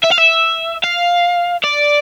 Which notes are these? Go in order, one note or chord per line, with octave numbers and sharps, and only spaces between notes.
E5
F5
E5
F5
D5